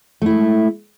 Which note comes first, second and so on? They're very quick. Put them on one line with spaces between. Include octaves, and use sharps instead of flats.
A3 E4 G#3